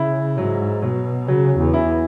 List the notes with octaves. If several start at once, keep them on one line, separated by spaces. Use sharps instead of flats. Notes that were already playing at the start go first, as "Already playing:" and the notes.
Already playing: C#3 E4
G#2 F#3
B2 F#3
C#3 F#3
E2
E4